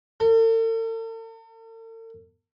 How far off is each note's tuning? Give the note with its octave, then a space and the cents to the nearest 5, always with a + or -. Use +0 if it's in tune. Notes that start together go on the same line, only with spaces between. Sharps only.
A4 +45